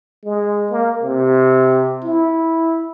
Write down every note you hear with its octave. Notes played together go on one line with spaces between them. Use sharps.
G#3
A#3
C3
E4